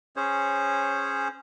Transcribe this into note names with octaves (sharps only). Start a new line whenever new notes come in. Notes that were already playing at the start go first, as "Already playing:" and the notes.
C#4 G#4 C5 C#5